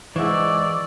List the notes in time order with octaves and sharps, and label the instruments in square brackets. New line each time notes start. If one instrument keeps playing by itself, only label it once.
[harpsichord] G#2 E4 [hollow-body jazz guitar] E3 [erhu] D5 [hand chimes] C#6 E6